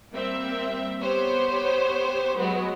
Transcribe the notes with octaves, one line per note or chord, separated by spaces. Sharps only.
G3 A#3 C4 E5
B3 G4 C5 C#5
F#3 G#3 B3 F#4